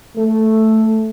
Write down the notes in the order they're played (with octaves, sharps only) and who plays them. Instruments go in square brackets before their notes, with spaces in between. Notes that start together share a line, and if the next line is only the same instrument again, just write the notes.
[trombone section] A3